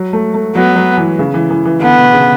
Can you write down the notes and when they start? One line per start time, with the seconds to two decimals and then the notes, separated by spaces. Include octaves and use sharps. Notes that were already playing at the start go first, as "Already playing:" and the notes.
Already playing: F#3
0.13 A3
0.34 A3
0.55 F#3 B3
0.76 F#3
0.97 E3
1.19 C#3
1.34 E3
1.51 E3
1.65 E3
1.82 D3 B3
1.98 B2
2.13 C#3